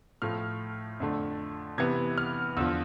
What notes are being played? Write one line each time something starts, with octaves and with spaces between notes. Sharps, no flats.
A2 F3 A3 F6
F2 D3 A3
C3 E3 B3 G#6
F6
E2 D3 F3 E6